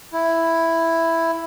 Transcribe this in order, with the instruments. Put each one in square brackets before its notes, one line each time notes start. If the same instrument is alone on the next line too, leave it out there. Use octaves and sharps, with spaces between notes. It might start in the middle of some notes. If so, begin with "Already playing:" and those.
[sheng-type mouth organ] E4